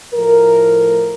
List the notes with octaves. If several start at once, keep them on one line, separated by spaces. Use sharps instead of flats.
A2 F3 A3 A#4